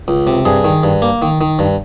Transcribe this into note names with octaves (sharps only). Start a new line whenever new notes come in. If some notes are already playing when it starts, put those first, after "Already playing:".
C#2
C3
G2 G#4
D#3
G2
A#3
D#3
D#3
G2